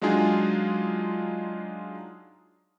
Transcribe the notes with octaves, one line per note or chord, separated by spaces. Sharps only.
F#3 G#3 D4 D#4 F4 G#4